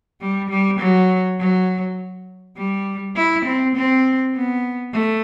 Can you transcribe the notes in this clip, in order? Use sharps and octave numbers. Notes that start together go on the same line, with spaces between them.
G3
G3
F#3
F#3
G3
E4
C4
C4
B3
A3